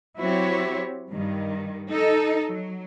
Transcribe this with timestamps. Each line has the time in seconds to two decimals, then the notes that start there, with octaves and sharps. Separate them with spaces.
0.19 F#3 C4 E4 F#4 G4 C#5
1.11 G2 D#3
1.90 D#4 A4
2.49 F#3